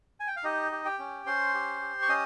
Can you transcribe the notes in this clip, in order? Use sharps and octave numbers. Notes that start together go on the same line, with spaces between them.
G#5
G5
F5
D#4 G4 D#5
G4
G4 G5
C#4
C#4 C5 C6
G4
G4
C#6
C#4 D#5 D#6